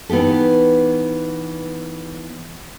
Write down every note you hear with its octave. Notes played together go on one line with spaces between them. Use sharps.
E3 B3 D#4 G4 A4